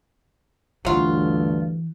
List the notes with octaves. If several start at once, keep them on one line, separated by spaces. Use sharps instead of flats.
D2 G2 E3 F#3 F4